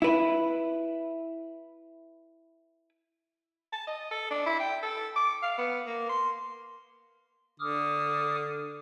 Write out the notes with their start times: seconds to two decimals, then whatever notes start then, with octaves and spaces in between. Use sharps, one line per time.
0.02 E4 B4
3.73 A5
3.87 D#5
4.11 A4
4.31 D4
4.46 E4
4.60 G5
4.83 A4
5.16 D6
5.43 F5
5.58 B3
5.87 A#3
6.10 C6
7.60 D3 D6 D#6 F6